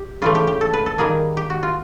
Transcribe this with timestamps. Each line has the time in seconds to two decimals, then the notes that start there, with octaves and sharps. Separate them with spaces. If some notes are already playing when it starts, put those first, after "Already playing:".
Already playing: G4
0.22 C#3 E3 A3 F4
0.35 G4
0.47 G4
0.61 A4
0.73 B4
0.86 A4
0.98 D#3 G3 A#3 G#4
1.37 G4
1.50 F#4
1.63 F4